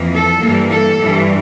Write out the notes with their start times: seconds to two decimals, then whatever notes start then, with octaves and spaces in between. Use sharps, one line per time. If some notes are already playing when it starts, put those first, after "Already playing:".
Already playing: F2 E3 A#3
0.13 A4
0.42 G2 E3 G3 A#3
0.71 A4
1.00 G2 E3 G3